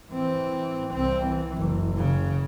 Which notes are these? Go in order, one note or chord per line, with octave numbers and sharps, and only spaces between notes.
E3 C4
C2 C4
E3
F#1
C#3